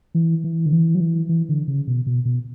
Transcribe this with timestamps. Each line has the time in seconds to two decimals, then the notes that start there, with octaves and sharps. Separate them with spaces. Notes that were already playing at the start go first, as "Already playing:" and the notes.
0.15 E3
0.44 E3
0.66 D3
0.72 E3
0.95 F#3
1.01 E3
1.29 E3
1.49 D3
1.68 C#3
1.87 B2
2.07 B2
2.25 B2